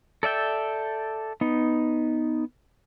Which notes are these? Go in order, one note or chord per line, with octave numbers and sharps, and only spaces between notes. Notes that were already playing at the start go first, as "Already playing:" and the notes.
A4 D5 E5 G5
B3 D#4